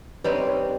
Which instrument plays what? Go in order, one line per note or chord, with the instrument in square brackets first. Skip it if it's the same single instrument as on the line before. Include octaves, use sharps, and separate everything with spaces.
[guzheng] G3 C4 D#4 [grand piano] B4 C#5
[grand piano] B4 C#5